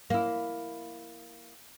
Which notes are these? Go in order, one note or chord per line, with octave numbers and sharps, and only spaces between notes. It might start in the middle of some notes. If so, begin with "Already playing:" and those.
A#3 E4